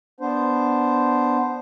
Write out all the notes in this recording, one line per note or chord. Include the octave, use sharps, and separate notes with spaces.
B3 D4 C5